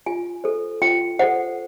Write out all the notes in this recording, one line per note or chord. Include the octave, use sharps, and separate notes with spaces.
F4 G#5
A4 C5
F4 G5
A4 C5 F#5